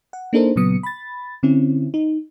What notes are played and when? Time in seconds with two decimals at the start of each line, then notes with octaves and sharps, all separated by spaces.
0.13 F#5
0.33 A#3 D4 D#4 A4 A#4 C5
0.56 A#2 C#3 F#3 B3 D#6 C#7
0.83 B5 A6
1.43 D3 C4 C#4 E4
1.94 D#4